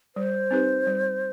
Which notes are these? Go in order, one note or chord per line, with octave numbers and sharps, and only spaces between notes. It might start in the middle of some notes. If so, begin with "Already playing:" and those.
G3 C5
C4 D#4 G4 B4
G3